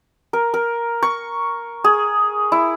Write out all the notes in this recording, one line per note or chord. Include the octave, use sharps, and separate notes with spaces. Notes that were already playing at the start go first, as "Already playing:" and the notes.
A#4
A#4
C#6
G#4
E4